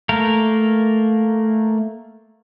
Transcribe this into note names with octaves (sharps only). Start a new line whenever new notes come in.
A3 A#3 A#4